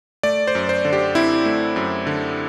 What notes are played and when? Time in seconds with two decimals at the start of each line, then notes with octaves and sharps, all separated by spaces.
0.23 A3 D5
0.47 C5
0.55 F#2
0.69 C5
0.85 D3
0.93 G4
1.15 C4 E4
1.45 A3
1.76 F#2
2.07 D3